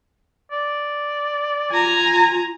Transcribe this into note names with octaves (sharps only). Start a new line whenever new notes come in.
D5
F4 G#5 A#5